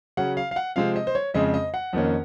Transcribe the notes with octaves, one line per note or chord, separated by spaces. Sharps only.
C#3 F#3 C#4 F#5
F5
F5
F#5
C3 F3 G#3 C4 F5
D#5
C5
C#5
F2 C#3 G#3 C4 D#5
D#5
F#5
F2 D#3 A#3 C#4